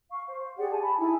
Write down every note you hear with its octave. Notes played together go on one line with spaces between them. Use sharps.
F5 C#6
C5
G4 G#4 D5 F#5
G#5 A5
A5 B5
D#4 E4 G#5